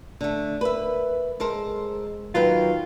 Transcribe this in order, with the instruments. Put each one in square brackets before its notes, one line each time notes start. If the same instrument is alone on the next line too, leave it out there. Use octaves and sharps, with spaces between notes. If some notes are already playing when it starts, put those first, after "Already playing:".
[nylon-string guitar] D3 A3
[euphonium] A#4 [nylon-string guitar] B4 E5
[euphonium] G#3 [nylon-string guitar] A4 A#4 C5
[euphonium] D#3 [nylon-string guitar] F#3 B4 G5 [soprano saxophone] F4